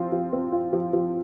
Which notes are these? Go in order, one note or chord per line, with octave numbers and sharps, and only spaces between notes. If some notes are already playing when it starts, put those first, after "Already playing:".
Already playing: F3 C4 F4
F3
C4
F4
F3
F3